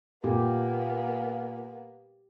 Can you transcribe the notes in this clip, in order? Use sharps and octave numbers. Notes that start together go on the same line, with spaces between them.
A#2 A#3 B3 G4